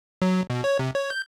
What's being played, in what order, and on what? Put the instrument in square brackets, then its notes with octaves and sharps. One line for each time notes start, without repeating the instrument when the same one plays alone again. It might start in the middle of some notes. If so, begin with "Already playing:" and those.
[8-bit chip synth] F#3
B2
C#5
C3
C#5
G6